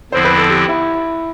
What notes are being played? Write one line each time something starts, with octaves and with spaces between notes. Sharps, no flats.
E2 D3 F3 C4 E4 C5
B4
A4
G4
E4